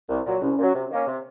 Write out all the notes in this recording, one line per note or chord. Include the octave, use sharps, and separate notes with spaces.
C2 A#4
A#2 F#3
C2 C#4
A#2
F#3
C3
D#3 A#3 C#4
C3